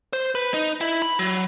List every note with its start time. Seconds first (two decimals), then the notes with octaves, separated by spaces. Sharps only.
0.13 C5
0.35 B4
0.54 D#4
0.81 E4
1.02 B5
1.19 F#3